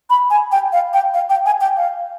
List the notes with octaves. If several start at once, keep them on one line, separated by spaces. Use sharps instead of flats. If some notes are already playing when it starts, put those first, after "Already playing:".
B5
G#5
G5
F5
G5
F5
G5
G#5
G5
F5